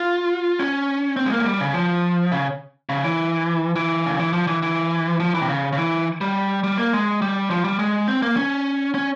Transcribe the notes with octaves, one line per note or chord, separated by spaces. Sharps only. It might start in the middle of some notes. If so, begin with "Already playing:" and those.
Already playing: F4
C#4
C4
G#3
A#3
G#3
G3
C#3
F3
C#3
C#3
E3
E3
C#3
E3
F3
E3
E3
F3
E3
C3
C#3
C#3
E3
G3
G3
A#3
G#3
G3
F3
G3
G#3
C4
A#3
C#4
C#4